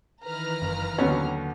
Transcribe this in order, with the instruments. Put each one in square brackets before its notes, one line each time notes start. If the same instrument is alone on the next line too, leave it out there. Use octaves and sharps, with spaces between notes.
[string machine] D#3 E3 [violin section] B4 A#5 F6
[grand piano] F#1
[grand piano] D#2 D3 F#3 [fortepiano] B3 C#4